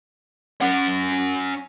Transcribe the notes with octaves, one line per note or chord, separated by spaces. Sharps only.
C#4 F#5